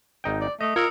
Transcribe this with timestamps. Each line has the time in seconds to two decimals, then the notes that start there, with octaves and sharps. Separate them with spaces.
0.24 G#1 D#4 G5
0.41 D5
0.61 A3 D#5 D#6
0.76 F4 A#4 A#5 E6 G#6 C#7